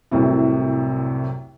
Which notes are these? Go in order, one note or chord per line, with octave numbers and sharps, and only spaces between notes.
C2 F#2 A2 C3